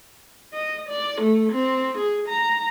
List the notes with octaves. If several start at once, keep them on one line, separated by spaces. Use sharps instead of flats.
D#5
D5
A3
C4
G#4
A#5